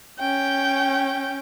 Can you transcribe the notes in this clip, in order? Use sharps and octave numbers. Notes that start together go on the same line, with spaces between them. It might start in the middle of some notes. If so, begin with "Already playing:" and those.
C#4 G5